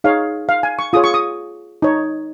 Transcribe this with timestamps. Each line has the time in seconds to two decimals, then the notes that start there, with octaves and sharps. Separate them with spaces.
0.04 D#4 G#4 C#5 F5
0.49 F5
0.63 G#5
0.79 C#6
0.93 F4 G#4 C#5 D#6
1.04 C#6
1.14 D#6
1.82 D#4 C#5